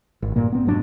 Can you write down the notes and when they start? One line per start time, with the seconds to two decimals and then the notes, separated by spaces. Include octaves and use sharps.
0.22 G#1
0.36 G2 A#2 A#3
0.52 B3 C4
0.65 F1 G#2 F#3 D4